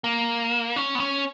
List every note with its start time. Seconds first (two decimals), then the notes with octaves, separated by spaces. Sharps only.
0.04 A#3
0.76 C#4
0.95 B3
1.00 C#4